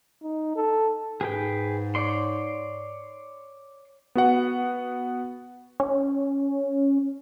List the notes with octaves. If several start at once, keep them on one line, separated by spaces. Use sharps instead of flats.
D#4
A4
G#2 G#4 B4 G5
C#5 D5 C6
B3 F#4 F#5
C#4